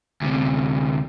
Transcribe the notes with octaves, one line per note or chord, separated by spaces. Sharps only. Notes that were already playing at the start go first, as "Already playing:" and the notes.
D2 C3